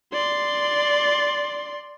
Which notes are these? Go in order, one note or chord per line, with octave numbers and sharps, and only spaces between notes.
D5 C6